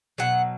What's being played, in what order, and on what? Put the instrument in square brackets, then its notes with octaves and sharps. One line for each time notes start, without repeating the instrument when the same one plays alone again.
[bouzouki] B2 F#3 F#5